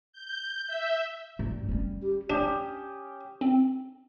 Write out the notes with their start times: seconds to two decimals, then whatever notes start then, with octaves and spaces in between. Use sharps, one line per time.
0.13 G6
0.67 E5
1.39 G2
1.69 G3 C#4
2.03 G4
2.30 C#4 D4 G4 D#5
3.41 C4